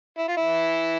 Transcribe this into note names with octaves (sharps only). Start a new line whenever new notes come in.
E4
F4
E3 E4